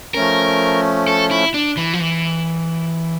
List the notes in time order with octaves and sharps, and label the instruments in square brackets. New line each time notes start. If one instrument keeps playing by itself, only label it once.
[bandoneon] F3 A3 C#4 [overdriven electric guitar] A#4
[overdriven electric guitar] A4
E4
D4
E3
F3
E3